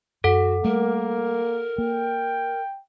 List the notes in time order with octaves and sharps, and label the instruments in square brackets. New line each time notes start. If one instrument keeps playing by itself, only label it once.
[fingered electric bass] F#2 [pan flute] F#4 [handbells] A4 F#5
[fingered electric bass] G3 A3 [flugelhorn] A#3 [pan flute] A#4
[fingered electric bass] A#3 [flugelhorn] G5